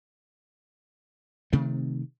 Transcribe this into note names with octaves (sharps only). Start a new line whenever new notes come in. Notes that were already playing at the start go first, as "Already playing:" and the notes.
C3 D#3 A3 C4